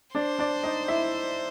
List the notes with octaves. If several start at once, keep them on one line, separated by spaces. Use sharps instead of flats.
D4 C5 D5
D4 D5
D#4 D#5
E4 E5